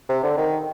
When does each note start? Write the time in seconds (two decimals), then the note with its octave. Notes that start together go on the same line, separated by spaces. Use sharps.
0.09 C3
0.24 D3
0.37 D#3